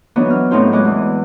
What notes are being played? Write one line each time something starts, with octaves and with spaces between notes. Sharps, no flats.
E3 F#3 B3 D4 D#4
F6
A2 F#3 C4 D#4 F4 C5
G#3 B3 D#5 D6 F#6
E2 E3